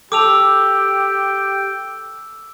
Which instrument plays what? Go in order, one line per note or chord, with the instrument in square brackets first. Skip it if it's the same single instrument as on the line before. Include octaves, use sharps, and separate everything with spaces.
[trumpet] G4 [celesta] A4 A5 F7 [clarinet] G5 [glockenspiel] D6 E6